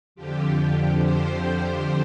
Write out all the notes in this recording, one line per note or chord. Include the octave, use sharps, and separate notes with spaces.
F2 D3 F3 G4
C5